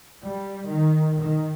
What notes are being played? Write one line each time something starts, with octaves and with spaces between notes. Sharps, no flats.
G3
D#3
D#3